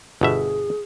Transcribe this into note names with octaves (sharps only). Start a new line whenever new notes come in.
G1 B2 G#4 E5